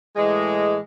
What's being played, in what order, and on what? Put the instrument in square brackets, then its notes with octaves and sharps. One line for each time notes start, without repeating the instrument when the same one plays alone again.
[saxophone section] A2 E3 G#3